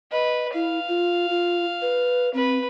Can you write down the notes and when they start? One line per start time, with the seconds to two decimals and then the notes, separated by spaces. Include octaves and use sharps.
0.12 B4 D#5
0.54 E4 F5
0.88 F4
1.30 F4
1.82 B4
2.34 C4 B4